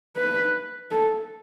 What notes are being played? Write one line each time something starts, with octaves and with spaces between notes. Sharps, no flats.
B4
A4